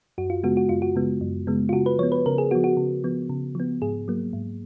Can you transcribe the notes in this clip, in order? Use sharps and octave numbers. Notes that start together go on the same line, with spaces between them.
F#2 F#4
F4
C#3 G#3 B3 F#4
F#4
F#2 F4
F#4
C#3 G#3 B3
F#2
C#3 G#3 B3
F4
C#3 F#4
B4
F3 B3 C#5
B4
C#3 A#4
G#4
F3 B3 F#4
F#4
C#3
F3 B3
C#3
F3 B3
G#2 G#4
F#3 A#3
G#2